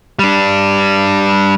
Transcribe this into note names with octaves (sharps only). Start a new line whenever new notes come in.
G3 D4